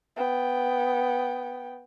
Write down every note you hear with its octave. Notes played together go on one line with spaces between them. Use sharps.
B3 G5